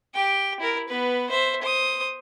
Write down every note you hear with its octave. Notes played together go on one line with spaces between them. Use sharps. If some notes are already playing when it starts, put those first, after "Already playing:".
G4 G5
E4 A#4
B3 B4
C5 E5
C5 D#6